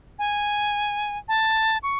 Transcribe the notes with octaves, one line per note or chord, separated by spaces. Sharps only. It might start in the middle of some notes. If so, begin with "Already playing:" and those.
G#5
A5
C#6